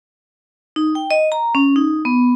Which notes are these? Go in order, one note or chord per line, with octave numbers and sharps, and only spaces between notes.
D#4
G5
D#5
A#5
C#4
D#4
B3